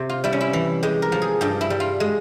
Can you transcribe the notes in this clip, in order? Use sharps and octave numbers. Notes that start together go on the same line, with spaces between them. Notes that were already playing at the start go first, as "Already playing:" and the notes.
Already playing: C3 G4
F4
G3 E4
C#4
E4
E3
G#3 G4
A#4
F3
G#4
G2 G4
E4
G3
F4
G#3